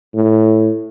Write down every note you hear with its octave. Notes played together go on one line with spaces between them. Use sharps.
A2